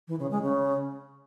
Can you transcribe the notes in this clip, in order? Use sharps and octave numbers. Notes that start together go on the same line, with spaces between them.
E3
C#3
G#3
C#3